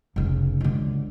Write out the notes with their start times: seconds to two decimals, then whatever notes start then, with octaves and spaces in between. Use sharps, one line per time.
0.16 F1 C#3
0.61 C#2 D3